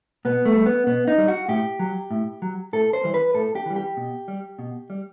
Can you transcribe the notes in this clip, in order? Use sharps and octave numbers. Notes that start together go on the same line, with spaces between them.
B2 B3
A3
G3
B3
B2 B3
D#4
G3
F#4
A2 G4
F#3
A2
F#3
A2 A4
C5
E3 G3
B4
A2 A4
G4
E3 G3
G4
B2
G3
B2
G3